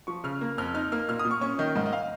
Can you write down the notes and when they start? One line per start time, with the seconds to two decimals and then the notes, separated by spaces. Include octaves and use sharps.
0.07 F3 C#6
0.24 C#3 F6
0.41 A#3
0.58 F2 F6
0.74 D#4 F6
0.92 A#3 F6
1.09 A#2 F6
1.19 D#6
1.25 A#2
1.31 C#6
1.41 C#4 C#6
1.59 D#3 D#5
1.75 G#2 D#5
1.86 D#5
1.93 F5